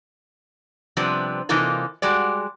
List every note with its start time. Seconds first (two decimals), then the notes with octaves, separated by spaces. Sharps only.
0.97 C3 F3 G3 B3 C4 D4
1.49 C3 E3 A#3 D#4 F4 A4
2.02 G3 G#3 F#4 D5